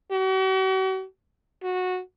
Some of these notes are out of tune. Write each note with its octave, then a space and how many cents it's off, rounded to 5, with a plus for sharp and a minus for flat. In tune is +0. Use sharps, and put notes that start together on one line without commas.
F#4 +45
F#4 -15